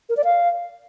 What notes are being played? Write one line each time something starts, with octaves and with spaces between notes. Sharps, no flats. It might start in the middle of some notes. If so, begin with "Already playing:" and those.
A#4
D5
F5